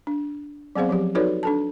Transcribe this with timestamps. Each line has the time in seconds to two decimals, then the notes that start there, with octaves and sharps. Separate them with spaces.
0.07 D4
0.76 F#3 B3 C4 G#4 C5 F5
0.89 F3 F#3 G4
1.15 D#4 F#4 A4 B4 C#5 D5
1.43 D4 A4 A5